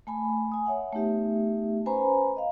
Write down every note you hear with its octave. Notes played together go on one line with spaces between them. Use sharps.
A3 G#5 B5
G#5 D#6
C#5 E5 F#5
A3 B3 D#4 G4 E5
C#4 B4 C5 G#5 A#5 B5
D#5 F5